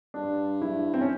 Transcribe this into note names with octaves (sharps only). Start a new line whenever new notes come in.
G2 D4
E4
C4
C#4